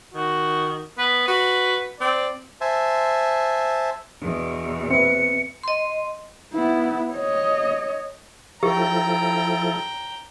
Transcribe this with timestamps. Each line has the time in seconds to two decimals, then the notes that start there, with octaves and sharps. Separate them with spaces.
0.14 D#3 F#4
0.98 B3 B4
1.28 F#4 B4
2.01 C4 D5
2.61 C5 E5 G#5 A5
4.22 E2 B2 B3 D4
4.91 C4 B4 E5 C#7
5.63 D#5 C6
6.53 B3 E4
7.14 C#5 D#5
8.63 F3 E4 G4 A4 G5 A#5